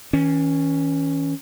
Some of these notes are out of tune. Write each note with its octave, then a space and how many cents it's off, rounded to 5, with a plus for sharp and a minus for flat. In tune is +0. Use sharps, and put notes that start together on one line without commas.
E3 -40 C#4 +0